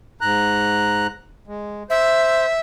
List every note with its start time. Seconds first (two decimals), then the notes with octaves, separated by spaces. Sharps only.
0.21 G#2 A#5 F#6
1.47 G#3
1.90 C5 E5